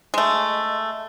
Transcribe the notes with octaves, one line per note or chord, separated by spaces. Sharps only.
G#3 A3